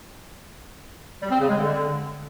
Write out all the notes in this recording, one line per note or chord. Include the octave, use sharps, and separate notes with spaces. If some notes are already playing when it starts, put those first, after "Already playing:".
G3
C4
C#3
G#3
D3